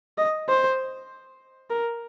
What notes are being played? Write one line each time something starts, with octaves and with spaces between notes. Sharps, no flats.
D#5
C5
A#4